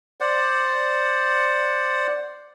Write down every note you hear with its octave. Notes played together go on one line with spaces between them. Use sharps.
C5 D5 F#5